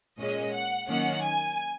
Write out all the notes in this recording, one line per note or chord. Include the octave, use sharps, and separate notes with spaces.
A#2 G#3 C#4 D#5
F#5
D#3 F#3 A#3 C#4 F#5
G#5